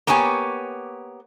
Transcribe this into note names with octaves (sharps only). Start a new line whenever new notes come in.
A#3 B3 G4 C#5 G#5